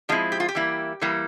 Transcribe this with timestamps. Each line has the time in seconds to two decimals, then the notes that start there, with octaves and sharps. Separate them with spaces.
0.09 F3 G#3 C4 E4 F4
0.32 G4
0.40 F4
0.49 G4
0.55 E3 G3 A#3 E4
1.01 E3 G3 A#3 E4